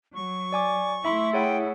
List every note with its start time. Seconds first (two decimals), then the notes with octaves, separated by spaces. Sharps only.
0.15 F#3 C#6
0.52 D5 G#5 D6
1.05 A3 E4 E5 B5 C6
1.33 G#4 C#5 F#5 G5